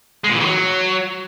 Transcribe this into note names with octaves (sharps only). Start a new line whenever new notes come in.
G#3
A#2
E3
D#3
F#3